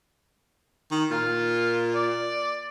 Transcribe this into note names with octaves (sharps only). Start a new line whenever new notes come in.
D#3
A#2 F4
D5